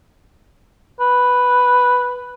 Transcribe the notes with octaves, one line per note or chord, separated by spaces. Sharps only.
B4